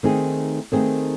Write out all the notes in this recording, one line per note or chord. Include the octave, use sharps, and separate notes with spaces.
D#3 A3 C4 D#4 G#4
D#3 A3 C4 D#4 G#4